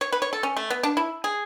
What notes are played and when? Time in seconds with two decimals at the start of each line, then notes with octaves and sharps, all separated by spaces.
0.01 C#5
0.12 B4
0.22 C#5
0.33 A4
0.43 C#4
0.57 A3
0.70 B3
0.83 D4
0.97 E4
1.24 G#4